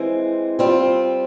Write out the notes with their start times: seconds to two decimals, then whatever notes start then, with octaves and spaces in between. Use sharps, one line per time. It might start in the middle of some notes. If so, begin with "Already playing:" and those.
Already playing: E3 G#3 C4
0.59 G3 C4 F4